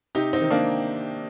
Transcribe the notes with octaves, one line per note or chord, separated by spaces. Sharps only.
C3 D#4 G4
C4 D#4
D#3
A#3 D4